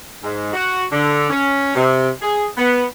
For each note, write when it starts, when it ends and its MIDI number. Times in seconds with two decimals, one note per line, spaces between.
0.24 0.53 44
0.54 0.84 66
0.92 1.30 50
1.30 1.75 61
1.76 2.09 48
2.21 2.46 68
2.57 2.83 59